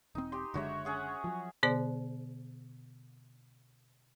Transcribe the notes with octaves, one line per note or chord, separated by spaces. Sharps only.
E1 C4 D#4
G4 C6
F#1 D3 G#3 F#4 C#5 E5
C#4 G#4 F#5
F3 F#3
B2 D3 B3 G#4 C5 D5